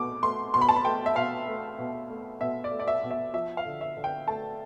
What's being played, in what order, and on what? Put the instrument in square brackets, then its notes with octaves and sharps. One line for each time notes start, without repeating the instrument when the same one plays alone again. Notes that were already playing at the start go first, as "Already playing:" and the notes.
Already playing: [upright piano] B2 A3 D6
A3 C6
B2 C6
B5
A5
B5
A3 G5
E5
B2 F5
A3
B2
A3
B2 E5
D5
A3
D5
E5
B2
E5
F3 E5
F5
D3
E5
D3
G5
A3 A5